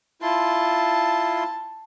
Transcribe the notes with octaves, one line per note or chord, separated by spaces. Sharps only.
E4 F4 A5 C6